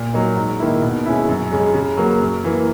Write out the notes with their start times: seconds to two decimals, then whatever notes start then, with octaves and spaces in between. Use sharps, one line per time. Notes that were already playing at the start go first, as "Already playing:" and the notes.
Already playing: A#2
0.13 F#3 A#3 D#4
0.36 G#2
0.59 D#3 A#3 E4
0.82 B2
1.06 G#3 C#4 E4
1.29 F#2
1.51 C#3 G#3 C#4
1.74 C#3
1.97 F#3 A#3
2.21 F#2
2.44 E3 A#3